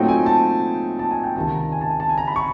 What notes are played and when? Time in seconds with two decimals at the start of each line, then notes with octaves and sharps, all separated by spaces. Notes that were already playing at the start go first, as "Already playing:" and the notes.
Already playing: A#2 F#3 A3 C4 D#4 G5
0.08 G#5
0.26 A5
0.99 A5
1.11 G#5
1.24 G5
1.36 C#2 C3 D#3 A5
1.47 A5
1.55 A#5
1.72 G#5
1.81 A5
1.90 G#5
2.00 A5
2.09 G#5
2.18 A#5
2.28 B5
2.36 C#6